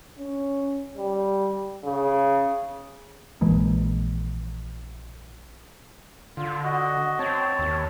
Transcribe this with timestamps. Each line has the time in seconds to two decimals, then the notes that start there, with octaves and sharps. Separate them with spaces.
0.19 C#4
0.97 G3
1.84 C#3
3.41 A#1 E3 G#3 A#3
6.37 D3 F4
6.64 F#4 D#5
7.19 C4 C#5 A5
7.59 D#2